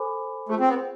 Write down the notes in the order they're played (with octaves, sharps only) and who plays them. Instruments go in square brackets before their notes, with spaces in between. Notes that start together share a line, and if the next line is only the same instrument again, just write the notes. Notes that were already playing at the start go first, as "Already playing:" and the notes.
Already playing: [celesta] A4 C5 G#5 B5 D6
[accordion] A3 [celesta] F4 G#4 C5
[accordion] C4
B3